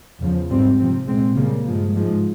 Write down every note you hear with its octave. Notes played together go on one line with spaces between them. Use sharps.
E2 C#3 F3
G#2 G3 C4
C3 F3 C4
A#2 G#3 C4
C#3 G3 A#3
G2 F3 G#3
G#2 F3 G#3